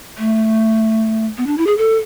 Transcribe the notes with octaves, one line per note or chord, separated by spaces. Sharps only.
A3
B3
D4
E4
G#4
A4